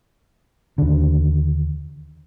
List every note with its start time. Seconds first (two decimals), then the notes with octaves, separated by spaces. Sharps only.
0.78 D#2 D3